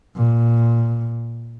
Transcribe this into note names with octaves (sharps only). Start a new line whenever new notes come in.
A#2